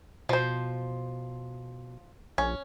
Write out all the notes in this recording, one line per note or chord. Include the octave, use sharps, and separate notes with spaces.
B2 F3 C5
A#1 C#4